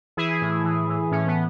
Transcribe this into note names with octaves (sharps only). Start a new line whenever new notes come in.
E3 E4 G#4
A2
E3
E3
A2 C#4
B3